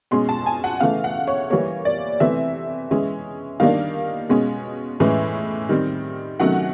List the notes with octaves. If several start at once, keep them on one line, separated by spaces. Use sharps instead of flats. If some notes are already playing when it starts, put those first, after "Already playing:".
B2 G#3 C#4 C6
A5
G#5
F#5
C#3 E3 A3 F5
F#5
C#5
E3 G3 A#3 C#5
D5
C3 E3 A3 C4 E5
E3 G#3 C#4
D#3 G3 A#3 D4 F5
B2 G#3 C#4
A2 E3 G#3 C#4
D#3 G3 C4
C3 D#3 F#3 A3 C#4 F#5